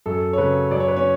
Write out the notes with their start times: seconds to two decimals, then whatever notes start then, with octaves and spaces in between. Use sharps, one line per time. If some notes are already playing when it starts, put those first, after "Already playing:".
0.06 F#2 A4
0.33 C#5
0.38 C#3 F#3 B4
0.71 F#2 D5
0.80 C#5
0.88 B4
0.97 C#4 C#5